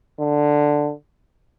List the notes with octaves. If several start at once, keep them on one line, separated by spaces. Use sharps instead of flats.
D3